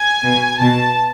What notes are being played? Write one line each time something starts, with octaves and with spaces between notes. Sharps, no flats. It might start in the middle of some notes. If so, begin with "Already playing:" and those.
Already playing: G#5
B2
B2 A5